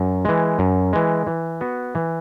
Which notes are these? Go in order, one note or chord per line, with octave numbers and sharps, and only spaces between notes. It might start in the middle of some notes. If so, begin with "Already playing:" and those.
Already playing: F#2
E3 G#3
F#2
E3 G#3
E3
B3 F#4
E3